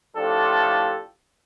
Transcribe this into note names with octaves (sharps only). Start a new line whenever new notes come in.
A2 F3 D4 F4 G4 A4